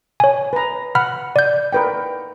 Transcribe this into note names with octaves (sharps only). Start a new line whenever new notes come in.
C#5 G#5
B4 A#5
F#5 B5 F6
D5 G6
A#4 B4 G5